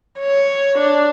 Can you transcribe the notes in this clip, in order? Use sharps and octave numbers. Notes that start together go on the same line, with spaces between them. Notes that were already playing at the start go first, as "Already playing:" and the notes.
C#5
D4